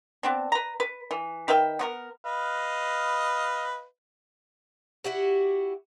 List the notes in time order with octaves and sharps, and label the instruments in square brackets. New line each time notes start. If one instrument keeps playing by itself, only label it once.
[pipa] B3 C4 D4
B4 A#5
B4
E3
D#3 B4 E5 G5
B3 F#4 A#4
[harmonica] B4 D#5 F5
[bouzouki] E4 F#4 G4